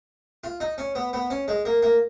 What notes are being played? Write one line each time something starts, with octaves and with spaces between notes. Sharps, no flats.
F4
D#4
C#4
B3
B3
C#4
G#3
A#3
A#3